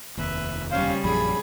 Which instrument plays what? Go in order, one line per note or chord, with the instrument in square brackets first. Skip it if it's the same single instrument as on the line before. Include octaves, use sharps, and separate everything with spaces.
[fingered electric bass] F1 D#2 [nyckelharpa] B4 E5
[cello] C#3 G3 [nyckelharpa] C#4 C5 [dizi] F5
[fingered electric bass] A#1 F#2 F3 [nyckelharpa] G#4 [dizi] B5